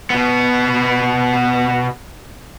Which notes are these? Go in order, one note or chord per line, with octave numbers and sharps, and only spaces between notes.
B2 B3